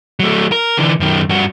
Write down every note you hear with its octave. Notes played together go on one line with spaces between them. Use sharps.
F#3 A3
A#4
D3 E3
F#2 D#3
G2 F#4